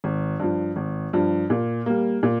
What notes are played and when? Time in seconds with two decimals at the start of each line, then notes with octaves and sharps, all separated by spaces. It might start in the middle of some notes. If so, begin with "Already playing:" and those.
0.04 G#1
0.40 G2 F3
0.76 G#1
1.13 G2 F3
1.50 A#2
1.86 G3 A#3
2.23 A#2